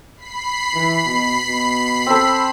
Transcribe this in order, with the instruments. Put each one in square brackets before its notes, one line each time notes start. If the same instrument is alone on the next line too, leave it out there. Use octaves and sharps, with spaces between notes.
[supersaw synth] B5 B6 C7
[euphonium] E3
B2
B2
[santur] C4 A4